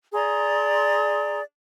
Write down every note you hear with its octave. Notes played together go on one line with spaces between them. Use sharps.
G#4 D5 A#5 C6